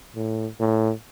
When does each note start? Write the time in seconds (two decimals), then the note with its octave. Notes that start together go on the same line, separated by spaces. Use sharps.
0.15 A2
0.60 A2